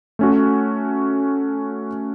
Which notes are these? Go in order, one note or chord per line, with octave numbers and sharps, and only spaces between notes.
A3 C#4 F#4